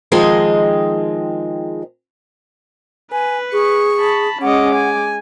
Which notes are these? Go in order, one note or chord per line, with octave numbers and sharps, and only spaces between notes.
D#3 F3 G#3 C4 G#4 D#5
B4 G#5
G#4 C#6
A5 B5
G#3 C#4 D#5 F#5 D6
G#5